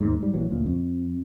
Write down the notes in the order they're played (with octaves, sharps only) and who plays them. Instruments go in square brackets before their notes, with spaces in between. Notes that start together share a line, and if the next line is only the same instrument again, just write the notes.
[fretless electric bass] D#2 G#2
G#2 G3
A#1 E3 F#3
D2 A#2
F2